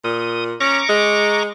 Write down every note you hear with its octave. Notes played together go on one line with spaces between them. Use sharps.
A#2 D#6
C#4 A#5 C#6 D6
G#3